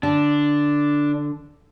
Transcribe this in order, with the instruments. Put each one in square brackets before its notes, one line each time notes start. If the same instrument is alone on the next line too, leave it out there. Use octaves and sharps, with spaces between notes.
[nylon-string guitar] D3 [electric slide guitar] D4